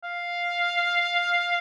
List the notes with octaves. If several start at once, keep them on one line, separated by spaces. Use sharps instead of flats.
F5